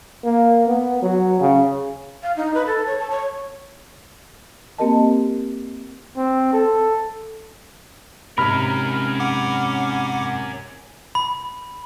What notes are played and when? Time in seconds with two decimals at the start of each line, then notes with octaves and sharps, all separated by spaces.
0.24 A#3
0.67 B3
1.02 F#3
1.40 C#3
2.23 F5
2.36 D#4
2.55 B4
2.66 A4
2.87 C#5
2.99 A5
3.11 C#5
4.78 A#3 C4 G4 A#4 D#5 A5
6.17 C4
6.53 A4
8.38 G#2 C3 C#4 A#4 B5 F6
9.20 F#5 D6
11.15 B5